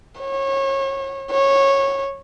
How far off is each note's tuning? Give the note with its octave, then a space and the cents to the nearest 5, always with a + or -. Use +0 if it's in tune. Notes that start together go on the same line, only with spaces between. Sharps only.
C#5 -30
C#5 -15